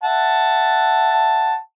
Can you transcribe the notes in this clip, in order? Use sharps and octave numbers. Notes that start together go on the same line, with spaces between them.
E5 F#5 A5